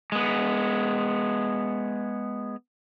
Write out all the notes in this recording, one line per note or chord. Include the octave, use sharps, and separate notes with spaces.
G#3 B3